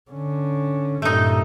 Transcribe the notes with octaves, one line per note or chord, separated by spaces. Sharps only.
D3 C#4
G2 A#2 A3 D#4